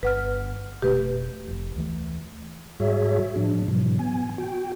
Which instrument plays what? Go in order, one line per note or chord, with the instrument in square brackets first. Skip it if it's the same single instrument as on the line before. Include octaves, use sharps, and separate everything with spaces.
[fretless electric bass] G1 [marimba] B4 F#5 F6
[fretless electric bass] F1 B2 A3 [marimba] G4 B4
[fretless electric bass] F1 F2
D2 E3 A3
[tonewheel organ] G#2 G3 F#4 G#4 C#5 E5
A2 F3 D4
G#2 B2 E3 F#3
B3 G#5
F#4 G5